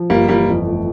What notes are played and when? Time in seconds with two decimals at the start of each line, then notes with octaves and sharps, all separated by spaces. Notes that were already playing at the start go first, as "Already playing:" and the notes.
Already playing: F3
0.10 G1 G3 A#3
0.28 E3 G3 A#3
0.48 F2
0.67 A3